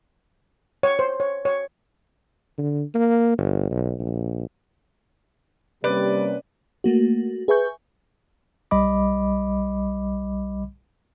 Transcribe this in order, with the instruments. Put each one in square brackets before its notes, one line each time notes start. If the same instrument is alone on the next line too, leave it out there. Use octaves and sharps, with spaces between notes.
[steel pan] C#5
C5
C#5
C#5
[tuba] D3
A#3
G1
B1
A#1
[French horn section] C3 A#3 C#4 [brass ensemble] G3 [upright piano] B4 [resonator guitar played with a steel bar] D5
[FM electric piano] A3 A#3 F#4
G#4 B4 E5 G#5 C#6 G6
[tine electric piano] B1 G3 D#5 B5 D6